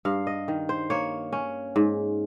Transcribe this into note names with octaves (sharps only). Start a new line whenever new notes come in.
G2 F5
D#5
D#3
C5
A#3 C#5
C#4
G#2